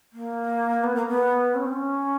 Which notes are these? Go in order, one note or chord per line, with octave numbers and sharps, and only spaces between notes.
A#3
B3
A#3
B3
C#4
C4
C#4